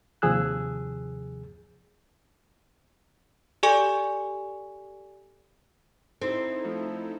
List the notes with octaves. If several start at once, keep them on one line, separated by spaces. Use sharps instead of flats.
D#2 C3 F3 G#4 E6 F#6
G4 A4 D5 G#5 C#6
C4 D#4 E4 A4
F3 A3